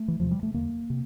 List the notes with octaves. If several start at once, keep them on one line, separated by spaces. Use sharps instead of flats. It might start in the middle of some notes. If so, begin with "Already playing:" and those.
Already playing: A3
E3
E2 C3 F3
G3
A3
E2 D3 A#3
C3